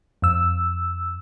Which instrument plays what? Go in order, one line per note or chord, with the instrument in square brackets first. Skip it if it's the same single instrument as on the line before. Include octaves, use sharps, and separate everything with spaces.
[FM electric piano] F2 E6